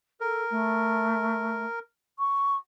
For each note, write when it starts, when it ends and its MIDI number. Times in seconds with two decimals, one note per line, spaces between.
0.20 0.43 69
0.20 1.79 70
0.50 1.64 57
2.19 2.55 85